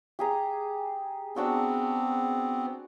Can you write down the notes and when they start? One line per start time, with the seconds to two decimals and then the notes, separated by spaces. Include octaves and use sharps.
0.19 G4 G#4 A#5
1.36 B3 C4 D4 F#4 E6